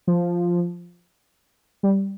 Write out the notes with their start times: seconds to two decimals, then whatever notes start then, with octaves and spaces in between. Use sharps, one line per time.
0.07 F3
1.83 G3